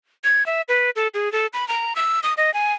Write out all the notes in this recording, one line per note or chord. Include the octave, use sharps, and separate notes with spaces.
G#6
E5
B4
A4
G#4
A4
B5
A#5
E6
D#6
D#5
G#5